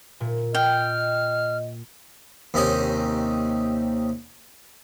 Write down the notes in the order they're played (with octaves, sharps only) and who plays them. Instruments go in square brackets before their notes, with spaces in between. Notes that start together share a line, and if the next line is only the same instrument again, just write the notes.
[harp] A#2
[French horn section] D#5 [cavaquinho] G5 [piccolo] F6
[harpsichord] D#2 C3 C#4 D#4 D#5 G#5